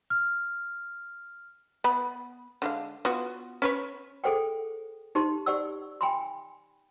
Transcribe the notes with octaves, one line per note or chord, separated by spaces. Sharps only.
F6
B3 B5
D3 G#3 F5
B3 F4 F#4
C#4 B4 C#5
G#4 A4 C5 F#5 G5
D#4 G4 C5 A5 C6
G4 C5 D5 F#5 E6
G5 G#5 B5 C6